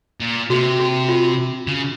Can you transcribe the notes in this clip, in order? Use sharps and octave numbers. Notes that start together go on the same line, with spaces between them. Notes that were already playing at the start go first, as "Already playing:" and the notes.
A#2
C3 F#4
F#4
F4
C#3